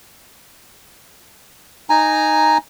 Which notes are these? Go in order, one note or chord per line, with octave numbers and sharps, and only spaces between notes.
D#4 G#5 A#5